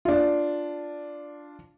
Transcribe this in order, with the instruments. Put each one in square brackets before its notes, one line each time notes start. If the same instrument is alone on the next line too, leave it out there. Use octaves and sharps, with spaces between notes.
[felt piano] D4 F4